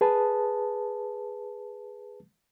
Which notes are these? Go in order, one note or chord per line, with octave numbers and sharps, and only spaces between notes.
G#4 B4 A5